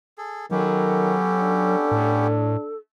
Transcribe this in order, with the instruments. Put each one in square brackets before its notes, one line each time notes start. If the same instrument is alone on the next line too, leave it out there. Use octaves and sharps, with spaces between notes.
[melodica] G#4 A4
[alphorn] D#3 [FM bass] F#3 [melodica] B3 C#4 G4 [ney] A4
[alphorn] D4
[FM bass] A2